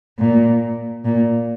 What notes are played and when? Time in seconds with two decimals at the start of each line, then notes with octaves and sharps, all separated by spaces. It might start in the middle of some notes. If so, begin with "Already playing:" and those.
0.19 A#2
1.05 A#2